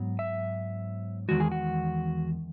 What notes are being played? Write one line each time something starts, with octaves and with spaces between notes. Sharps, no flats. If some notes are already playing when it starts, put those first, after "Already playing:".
Already playing: G#2 F#3 B3
E5
E2 D#3 G#3 F#4
G#4
F#4